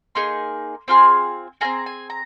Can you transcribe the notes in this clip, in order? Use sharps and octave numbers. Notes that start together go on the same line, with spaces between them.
A#3 D#4 G#4 C6
C4 F4 G#4
C4 F4 G#4 A#5
G#5
A#5